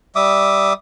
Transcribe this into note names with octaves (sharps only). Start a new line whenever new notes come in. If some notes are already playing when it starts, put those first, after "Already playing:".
G3 E5 D6 D#6